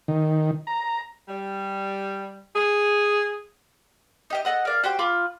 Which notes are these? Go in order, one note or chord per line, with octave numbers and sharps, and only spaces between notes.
D#3
A#5
G3
G#4
D#4 G4 D#5
A4 D#5 F#5 D#6
A#4 D5 F5
F#4 G4 C5 G5
F4 B5 D6